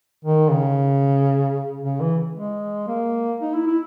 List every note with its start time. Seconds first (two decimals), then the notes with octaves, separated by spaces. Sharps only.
0.25 D#3
0.52 C#3
1.83 C#3
2.01 E3
2.35 G#3
2.88 A#3
3.41 D#4
3.54 E4
3.67 E4